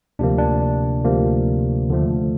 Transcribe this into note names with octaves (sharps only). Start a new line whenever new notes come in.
D2 C3 F3 A#3 D4
D4
D2 C3 F3 A#3
D#2 D3 F3 A3